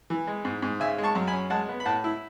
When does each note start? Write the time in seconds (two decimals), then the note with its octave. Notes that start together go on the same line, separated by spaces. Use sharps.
0.10 E3
0.27 G#3
0.45 G#2
0.62 G#2
0.80 C#3 E5 G#5
0.98 G#3
1.03 A5 C#6
1.15 F#2
1.27 G#5 B5
1.33 C#4
1.50 G#3 F#5 A5
1.69 B3
1.80 B5
1.85 A2 F#5 A5
2.04 E4